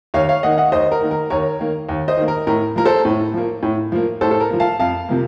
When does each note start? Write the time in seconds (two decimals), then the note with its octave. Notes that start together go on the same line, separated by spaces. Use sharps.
0.14 D#2 C#5 F5
0.29 C#5 F5
0.43 D#3 A#3 D#5 F#5
0.58 D#5 F#5
0.72 D#2 C5 D#5
0.92 A#4
1.01 D#3 A#3
1.11 A#4
1.30 D#2 A#4 C#5
1.59 D#3 A#3
1.89 D#2
2.08 C5 D#5
2.17 D#3 A#3
2.28 A#4
2.47 A2 A#4
2.76 F3 A#3 A#4
2.85 A4 C5
3.05 A2
3.34 F3 A#3
3.63 A2
3.92 F3 A#3
4.21 A2 A4 C5
4.31 A4
4.40 A#4
4.50 F3 A#3
4.60 F5 A5
4.79 F2 F5 A5
5.09 C3 F3 A#3